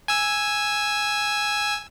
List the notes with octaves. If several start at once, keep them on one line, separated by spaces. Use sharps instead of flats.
G#5 E6